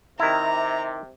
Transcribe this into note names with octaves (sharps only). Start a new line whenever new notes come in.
C3 D#3 E4 A#5